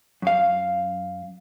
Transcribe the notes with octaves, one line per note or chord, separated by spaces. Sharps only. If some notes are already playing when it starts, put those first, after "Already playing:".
F#2 F5